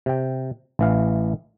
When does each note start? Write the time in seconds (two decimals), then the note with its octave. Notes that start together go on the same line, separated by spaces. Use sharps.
0.06 C3 G5
0.79 A1 E3 F5